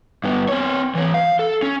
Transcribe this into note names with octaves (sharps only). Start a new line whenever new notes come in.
G2 B3
C4 C#5
E3 C#5
F5
A4
C#4